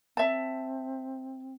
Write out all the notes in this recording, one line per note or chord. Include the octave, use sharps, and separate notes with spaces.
C4 E5 A5